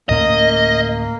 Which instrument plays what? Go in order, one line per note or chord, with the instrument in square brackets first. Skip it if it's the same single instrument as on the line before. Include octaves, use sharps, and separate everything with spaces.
[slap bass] D2 A2 C#4 [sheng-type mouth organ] A#3 [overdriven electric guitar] D#5